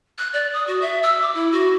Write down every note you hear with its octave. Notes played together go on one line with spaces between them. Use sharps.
F#6
D5
D#6
F#4
E5
E6
D6
E4
F#4